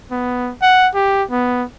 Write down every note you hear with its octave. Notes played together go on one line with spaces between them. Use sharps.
B3
F#5
G4
B3